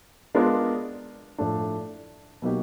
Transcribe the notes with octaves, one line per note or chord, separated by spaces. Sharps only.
G#3 B3 D4 F4 A#4
A2 F3 A3 D4
B2 F#3 A#3 D#4 G4